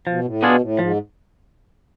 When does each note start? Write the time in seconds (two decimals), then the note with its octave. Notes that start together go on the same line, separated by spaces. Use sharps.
0.07 B2 F3
0.24 A2
0.42 B2 B3 D4 F4 G#4
0.61 A2
0.78 G#2 F3